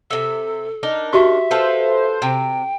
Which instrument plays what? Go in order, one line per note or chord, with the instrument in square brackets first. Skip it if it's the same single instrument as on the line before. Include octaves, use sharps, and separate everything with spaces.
[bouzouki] C3 E5 [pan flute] A4
[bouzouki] D4 D#4 A#4
[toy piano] F#4 G4 C#6 [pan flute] E5
[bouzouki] F4 A4 B4 [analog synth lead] C5
[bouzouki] C3 [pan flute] G5